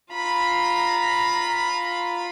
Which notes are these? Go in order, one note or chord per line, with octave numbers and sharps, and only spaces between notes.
F4 A#5 B5